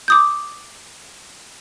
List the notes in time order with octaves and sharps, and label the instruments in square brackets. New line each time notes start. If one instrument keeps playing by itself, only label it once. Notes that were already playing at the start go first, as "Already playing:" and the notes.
[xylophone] D6 D#6 G6